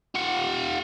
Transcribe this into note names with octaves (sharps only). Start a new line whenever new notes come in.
F4 F#5